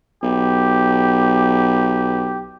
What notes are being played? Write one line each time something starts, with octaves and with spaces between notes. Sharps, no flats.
B1 G4